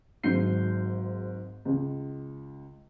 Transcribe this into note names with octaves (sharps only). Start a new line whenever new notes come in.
G#1 G#2 F#3 G6 C7
C#2